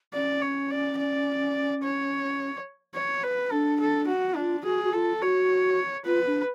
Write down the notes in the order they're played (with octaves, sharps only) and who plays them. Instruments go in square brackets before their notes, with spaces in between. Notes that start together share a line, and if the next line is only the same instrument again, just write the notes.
[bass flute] C#4 [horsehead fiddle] D5
[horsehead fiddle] C#5
D5
D5
C#5
C#5
B4
[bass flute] D4 [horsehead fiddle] A4
[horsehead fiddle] A4
F#4
[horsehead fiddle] D4 [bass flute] F4
[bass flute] F#4 [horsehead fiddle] G#4
[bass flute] F#4
[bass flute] F4 [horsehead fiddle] A4
[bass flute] F#4 [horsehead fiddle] C#5
[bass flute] F4 [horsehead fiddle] B4
[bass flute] D4